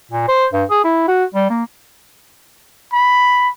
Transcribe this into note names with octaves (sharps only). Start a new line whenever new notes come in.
A#2
C5
G2
G#4
E4
F#4
G3
A#3
B5